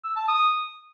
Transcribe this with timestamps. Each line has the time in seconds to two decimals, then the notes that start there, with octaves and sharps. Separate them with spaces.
0.04 E6
0.16 A5
0.28 D#6